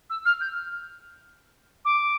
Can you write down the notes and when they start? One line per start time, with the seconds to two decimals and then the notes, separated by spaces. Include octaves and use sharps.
0.10 E6
0.25 F6
0.41 G6
1.85 D6